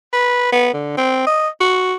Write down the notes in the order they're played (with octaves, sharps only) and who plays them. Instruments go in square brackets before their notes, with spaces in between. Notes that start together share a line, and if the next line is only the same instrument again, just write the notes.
[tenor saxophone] B4
B3
D3
C4
D#5
F#4